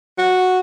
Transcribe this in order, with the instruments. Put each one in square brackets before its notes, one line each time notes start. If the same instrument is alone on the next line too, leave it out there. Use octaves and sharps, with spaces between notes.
[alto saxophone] F#4